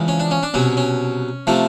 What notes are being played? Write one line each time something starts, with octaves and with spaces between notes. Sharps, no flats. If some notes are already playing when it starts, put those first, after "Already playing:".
Already playing: E2 C#3 F3 G#3
C#4
D4
C#4
D4
C2 B2 F#3 C#4
C#4
C3 F3 A3